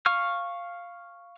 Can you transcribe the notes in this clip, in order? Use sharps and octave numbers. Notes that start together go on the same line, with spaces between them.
F5 C#6 F6